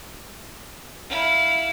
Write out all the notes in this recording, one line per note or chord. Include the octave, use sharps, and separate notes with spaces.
E4 F5